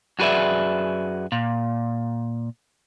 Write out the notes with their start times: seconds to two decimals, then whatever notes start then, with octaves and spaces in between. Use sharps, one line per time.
0.19 F#2 F#4 G#4 B4 D5 E5
1.32 A#2